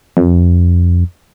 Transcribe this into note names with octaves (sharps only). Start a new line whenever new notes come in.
F2